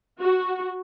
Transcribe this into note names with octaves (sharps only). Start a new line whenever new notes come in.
F#4